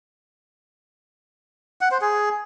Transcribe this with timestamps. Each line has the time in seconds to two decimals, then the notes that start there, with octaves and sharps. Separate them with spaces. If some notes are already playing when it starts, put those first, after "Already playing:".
1.81 F#5
1.91 C5
2.01 G#4